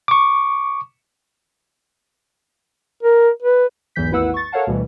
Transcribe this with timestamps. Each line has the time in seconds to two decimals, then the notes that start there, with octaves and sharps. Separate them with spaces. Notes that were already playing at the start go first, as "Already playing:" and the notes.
0.08 C#6 D6
3.03 A#4
3.42 B4
3.96 B1 E2 G#2 E3 G6 B6
4.11 G#1 D#2 E4 B4 F#5 E6
4.34 C#6 A6
4.52 A4 A#4 C#5 F5 F#5 A5
4.67 D2 B2 E3 G3